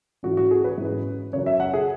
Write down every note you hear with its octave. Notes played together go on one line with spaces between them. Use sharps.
G#2 E3 C#4 F#4
F#4
G#4
B4
G#2 E3 C#4
F#2 C#3 F#3 C#5
E5
F#5
G#4